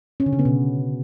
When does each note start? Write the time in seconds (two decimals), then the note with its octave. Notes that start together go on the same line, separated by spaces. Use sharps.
0.20 C#4
0.26 D3
0.33 C#3
0.39 B3
0.45 B2